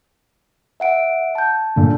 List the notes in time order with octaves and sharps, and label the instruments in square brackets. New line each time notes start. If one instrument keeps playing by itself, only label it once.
[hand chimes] E5 F#5 D7
A5 G6
[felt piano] A#2 D3